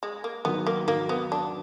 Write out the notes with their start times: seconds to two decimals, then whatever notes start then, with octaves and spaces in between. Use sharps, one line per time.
0.03 G#3
0.24 A#3
0.45 D#3 F#3 B3
0.67 A#3
0.88 D#3 F#3 A#3
1.09 B3
1.32 D4